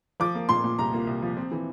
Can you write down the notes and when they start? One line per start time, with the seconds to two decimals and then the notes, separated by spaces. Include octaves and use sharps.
0.20 F3 D6
0.35 A#3
0.49 A#2 C6
0.64 A#2
0.78 C2 A#5
0.93 A#3
1.07 C2
1.22 F3
1.37 C4
1.51 E3